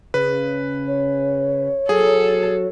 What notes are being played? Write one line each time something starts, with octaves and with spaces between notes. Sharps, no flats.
C#3 B4
C#5
F#3 G#4 A4